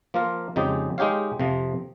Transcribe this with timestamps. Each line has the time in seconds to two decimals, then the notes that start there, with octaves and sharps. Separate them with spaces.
0.14 F3 A#3 F4 A#4
0.56 F2 C#3 G#3 D#4 G4
0.98 G#3 D#4 G4 C#5 F5
1.40 F2 C3 F3